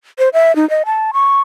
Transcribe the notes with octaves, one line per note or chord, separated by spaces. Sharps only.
C5
E5
D#4
D#5
A5
C#6